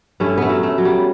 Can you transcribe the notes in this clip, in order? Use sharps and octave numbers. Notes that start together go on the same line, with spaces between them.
G2 A3 C#4
A3 B3
F#3
A3
F#3
G3